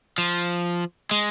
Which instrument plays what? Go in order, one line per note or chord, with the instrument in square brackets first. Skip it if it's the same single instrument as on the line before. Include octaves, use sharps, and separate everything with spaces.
[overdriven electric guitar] F3
G#3